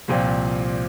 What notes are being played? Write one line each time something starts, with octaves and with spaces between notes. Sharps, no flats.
C2 A#2 F3 C4 F4